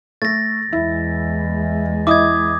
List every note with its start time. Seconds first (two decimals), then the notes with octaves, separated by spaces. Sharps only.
0.22 A3 A6 A#6
0.73 E2 G#3 E4
2.07 E4 D#5 D6 D#6 G#6